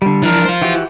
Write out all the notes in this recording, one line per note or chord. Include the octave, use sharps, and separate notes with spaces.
D3 G3
E3 F3 D4 A#4
F4 C5
E3 F#4 G4